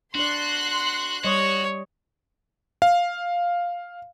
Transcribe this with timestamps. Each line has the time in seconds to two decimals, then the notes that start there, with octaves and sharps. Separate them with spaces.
0.15 D4 F#4 D5 C6 F#6
1.24 G3 F#4 C#5 D#5
2.82 F5